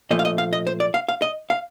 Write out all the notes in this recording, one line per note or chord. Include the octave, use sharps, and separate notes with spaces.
A#2 F3 A3 D#5
F5
D#5
F5
D#5
C5
D5
F5
F5
D#5
F5